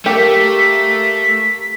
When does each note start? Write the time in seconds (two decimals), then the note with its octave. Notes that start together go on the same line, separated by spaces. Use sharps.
0.06 A3 A#3 G4 A#4 G5 B6